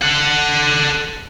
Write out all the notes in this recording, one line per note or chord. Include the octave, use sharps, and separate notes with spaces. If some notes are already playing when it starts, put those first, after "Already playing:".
A4 F#5